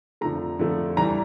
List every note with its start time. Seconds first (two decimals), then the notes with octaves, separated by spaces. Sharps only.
0.21 F2 D3 F3 A3 A#5
0.59 F2 D3 F3 A3
0.97 E3 G3 A#5